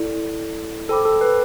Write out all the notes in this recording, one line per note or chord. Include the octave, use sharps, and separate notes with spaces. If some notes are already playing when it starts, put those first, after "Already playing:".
Already playing: E4 A4 D5
A4 C5 G5 B5 D6
A4
B4